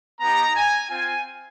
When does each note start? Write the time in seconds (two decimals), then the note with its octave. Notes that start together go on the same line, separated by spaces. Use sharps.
0.21 B3 D#4 G4 A#5
0.55 G#5
0.90 C4 F4 G#5